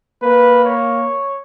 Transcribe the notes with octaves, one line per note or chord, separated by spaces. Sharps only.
A#3 B4
C#5